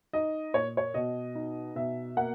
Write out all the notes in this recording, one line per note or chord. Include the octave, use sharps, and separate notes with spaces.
D#4 D#5
A#2 C#5
C#5
B2 D#5
D#4
B2 E5
A#3 F#5